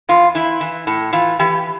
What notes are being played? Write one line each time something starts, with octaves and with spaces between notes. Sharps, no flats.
E2 F4
E3 E4
E3
A2
E3 F4
E3 G4